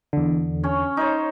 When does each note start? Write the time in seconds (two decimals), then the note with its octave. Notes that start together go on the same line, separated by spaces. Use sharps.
0.13 E2 D3
0.63 C#4 C#5
0.97 D#4 C5 C#5